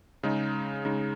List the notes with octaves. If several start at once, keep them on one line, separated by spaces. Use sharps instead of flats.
C#3 G#3 D#4
C#3 G#3 D#4